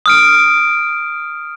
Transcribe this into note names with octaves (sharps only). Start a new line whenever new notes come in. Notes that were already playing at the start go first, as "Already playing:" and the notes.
D#6 F6 D7